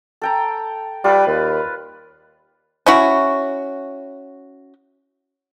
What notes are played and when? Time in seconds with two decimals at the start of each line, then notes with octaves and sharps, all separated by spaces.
0.22 A4 G5 A#5
1.04 G3 F4 B4
1.27 D#2
2.86 C#4 E4 F#4